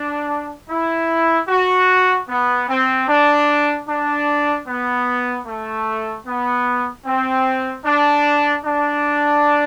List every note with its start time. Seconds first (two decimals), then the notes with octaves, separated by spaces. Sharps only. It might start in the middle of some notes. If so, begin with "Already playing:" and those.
Already playing: D4
0.69 E4
1.48 F#4
2.28 B3
2.68 C4
3.08 D4
3.87 D4
4.68 B3
5.46 A3
6.26 B3
7.05 C4
7.84 D4
8.65 D4